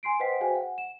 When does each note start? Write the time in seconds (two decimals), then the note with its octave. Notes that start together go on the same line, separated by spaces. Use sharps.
0.03 G#5 C6 C7 D7
0.20 B4 C5 D#5 F#5 G5 B6
0.40 F#4 G#4 C5 F5 G5 G#5
0.55 F#5
0.78 E7